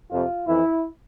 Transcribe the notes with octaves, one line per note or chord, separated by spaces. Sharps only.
F2 C3 F3 F4
F2 E3 E4